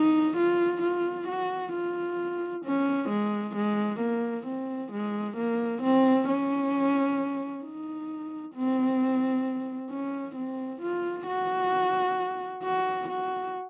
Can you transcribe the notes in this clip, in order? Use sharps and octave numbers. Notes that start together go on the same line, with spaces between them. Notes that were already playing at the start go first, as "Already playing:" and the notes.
Already playing: D#4
F4
F4
F#4
F4
C#4
G#3
G#3
A#3
C4
G#3
A#3
C4
C#4
D#4
C4
C#4
C4
F4
F#4
F#4
F#4